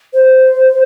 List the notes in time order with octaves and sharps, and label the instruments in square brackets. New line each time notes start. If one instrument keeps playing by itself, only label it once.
[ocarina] C5